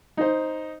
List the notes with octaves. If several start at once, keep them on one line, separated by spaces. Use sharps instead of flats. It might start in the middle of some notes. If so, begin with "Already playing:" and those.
D#4 C5